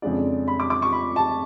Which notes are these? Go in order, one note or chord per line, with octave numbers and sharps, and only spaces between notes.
F2 C#3 G#3 D4 D5
B5
D6
D6
C#6
B5
A5